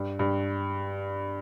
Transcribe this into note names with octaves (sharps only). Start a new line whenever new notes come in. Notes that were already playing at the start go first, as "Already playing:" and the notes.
Already playing: G2
G2